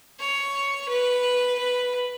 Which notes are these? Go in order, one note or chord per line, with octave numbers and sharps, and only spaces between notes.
C#5
B4
B4